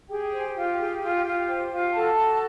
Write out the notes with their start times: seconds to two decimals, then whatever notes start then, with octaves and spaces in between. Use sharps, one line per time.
0.09 G4 G#4 G5
0.32 C5
0.55 F4
0.79 G#4
1.02 F4
1.24 F4
1.48 C5
1.71 F4
1.94 F#4 A4 A5
2.17 F#4